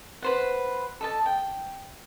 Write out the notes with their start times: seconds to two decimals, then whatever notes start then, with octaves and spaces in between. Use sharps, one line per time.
0.22 B4 C5 F#5
1.01 A4 D#5 A5
1.26 G5